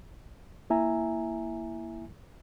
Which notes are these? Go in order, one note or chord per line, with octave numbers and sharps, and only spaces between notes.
A#3 E4 E5 G#5 A#5